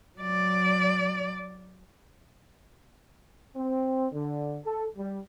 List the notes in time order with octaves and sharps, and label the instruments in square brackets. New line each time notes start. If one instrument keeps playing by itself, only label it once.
[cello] F#3 D5
[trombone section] C4
D3
A4
G3